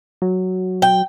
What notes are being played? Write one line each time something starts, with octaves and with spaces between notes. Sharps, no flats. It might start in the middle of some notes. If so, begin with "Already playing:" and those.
F#3
G5